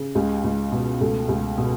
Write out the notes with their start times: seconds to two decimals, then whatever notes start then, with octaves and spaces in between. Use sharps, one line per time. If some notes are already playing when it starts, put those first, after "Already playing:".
Already playing: C#3
0.15 C#2 G#3
0.44 C#2
0.72 B2
1.01 C#2 A3
1.29 C#2
1.58 B2